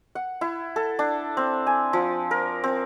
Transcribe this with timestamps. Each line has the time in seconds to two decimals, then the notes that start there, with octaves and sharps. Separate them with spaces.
0.15 F#5
0.41 E4
0.76 A4
0.99 D4
1.37 C4
1.67 G#5
1.93 F3
2.31 A#4
2.64 C4